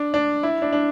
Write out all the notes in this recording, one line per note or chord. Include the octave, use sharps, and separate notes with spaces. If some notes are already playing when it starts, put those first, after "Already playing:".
Already playing: D4
D4
E4
D4
D4